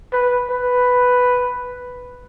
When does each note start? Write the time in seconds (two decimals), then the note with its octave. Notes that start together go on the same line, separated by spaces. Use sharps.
0.13 B4
0.50 B4